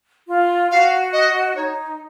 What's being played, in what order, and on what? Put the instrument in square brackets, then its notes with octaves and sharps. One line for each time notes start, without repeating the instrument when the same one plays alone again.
[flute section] F4
[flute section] F#4 [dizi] F5
[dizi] D#5
[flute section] D#4 [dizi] C#5